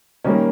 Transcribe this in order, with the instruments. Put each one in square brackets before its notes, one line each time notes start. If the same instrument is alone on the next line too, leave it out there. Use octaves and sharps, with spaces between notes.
[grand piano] D#3 G3 A#3 C#4